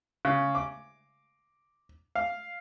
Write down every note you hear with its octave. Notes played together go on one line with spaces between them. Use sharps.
C#3
D6
F5